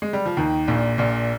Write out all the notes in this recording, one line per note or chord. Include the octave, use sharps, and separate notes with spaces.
G#3
G3
F3
D#2 D#3
A#1 A#2
A#1 A#2